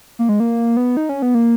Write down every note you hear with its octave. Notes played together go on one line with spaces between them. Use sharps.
A#3
G#3
A#3
B3
D#4
C#4
B3
A#3